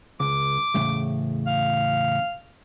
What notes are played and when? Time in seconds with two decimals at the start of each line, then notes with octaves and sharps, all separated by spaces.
0.20 C#2 D6
0.74 E2 A2 C#3
1.47 F5